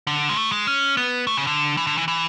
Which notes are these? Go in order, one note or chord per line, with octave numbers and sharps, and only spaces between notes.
D3
G#3
A3
G#3
C#4
B3
A3
C#3
D3
E3
D3
E3
E3